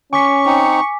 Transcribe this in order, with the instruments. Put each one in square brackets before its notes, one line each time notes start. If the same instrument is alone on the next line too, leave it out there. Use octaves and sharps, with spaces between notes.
[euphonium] C#4 [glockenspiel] G#5 D6 B6 [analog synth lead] C#6
[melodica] C4 D#4